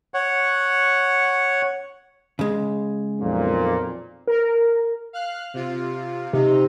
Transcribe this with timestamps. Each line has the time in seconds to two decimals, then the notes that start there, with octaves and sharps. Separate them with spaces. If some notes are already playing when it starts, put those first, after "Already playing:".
0.14 C#5 F#5
2.39 C#3 G#3
3.19 B1 F2 A#2
4.27 A#4
5.13 F5 F6 F#6
5.54 C3 F4
6.33 C3 D#4